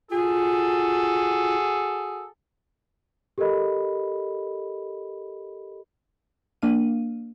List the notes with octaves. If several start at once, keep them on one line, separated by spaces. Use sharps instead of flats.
F4 F#4 G#4 A4
G4 A4 A#4 D#5 B5
A#3 D4 F5 D#7